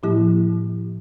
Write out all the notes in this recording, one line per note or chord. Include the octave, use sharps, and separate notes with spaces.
A2 F3 A#3 E4 G4